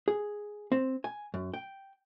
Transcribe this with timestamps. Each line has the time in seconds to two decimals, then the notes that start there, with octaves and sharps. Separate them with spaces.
0.08 G#4
0.72 C4
1.04 G#5
1.34 F#2
1.54 G5